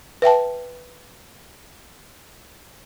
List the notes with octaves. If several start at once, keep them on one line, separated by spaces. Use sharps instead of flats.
B4 E5 G5 A5